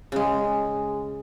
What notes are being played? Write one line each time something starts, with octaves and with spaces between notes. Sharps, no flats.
C#3 G#3